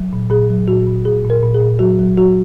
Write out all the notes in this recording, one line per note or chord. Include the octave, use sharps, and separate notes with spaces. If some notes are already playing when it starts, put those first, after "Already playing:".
Already playing: F#3
A#2
A#2 G#4
F#3
A#2 F#4
A#2
A#2 G#4
A#2
A#4
A#2
G#4
A#2
F#3 F#4
F#3
F#3 F#4